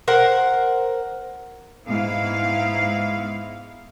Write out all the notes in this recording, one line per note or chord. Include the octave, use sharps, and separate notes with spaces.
A#4 C5 F#5
G#2 B3 E4 F5